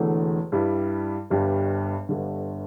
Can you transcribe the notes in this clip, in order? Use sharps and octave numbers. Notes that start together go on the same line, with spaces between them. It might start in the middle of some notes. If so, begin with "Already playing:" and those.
Already playing: E1 E2 D3 A3 E4
G2 G3 E4
G1 G2 G3 D4 G4
G1 G2 D3